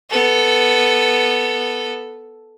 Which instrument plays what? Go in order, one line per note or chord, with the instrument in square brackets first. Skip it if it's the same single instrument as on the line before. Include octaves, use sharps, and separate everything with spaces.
[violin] B3 A4